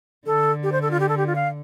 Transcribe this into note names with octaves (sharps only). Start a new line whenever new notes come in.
D3 A4
G4
C5
A4
F4
G4
A4
G4
F4
F5